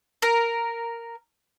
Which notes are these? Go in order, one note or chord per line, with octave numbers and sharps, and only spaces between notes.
A#4